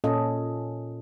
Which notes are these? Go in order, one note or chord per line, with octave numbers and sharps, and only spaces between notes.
A#2 C#4 A4 D#5